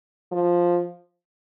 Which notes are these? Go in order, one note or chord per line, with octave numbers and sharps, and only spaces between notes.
F3